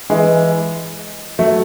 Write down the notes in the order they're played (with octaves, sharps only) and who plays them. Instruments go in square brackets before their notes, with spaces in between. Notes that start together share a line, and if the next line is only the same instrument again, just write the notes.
[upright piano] E3 G#3
F#3 A3